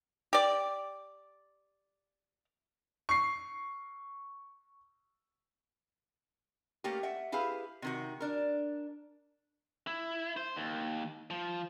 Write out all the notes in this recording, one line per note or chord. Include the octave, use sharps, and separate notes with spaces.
G4 D5
C#6 C7
A3 A#3 C#4 G4
E5 F#5
E4 G4 G#4 B4 F5
C3 D#3 F#4
D4 A#4
E4
C5
D#2
F3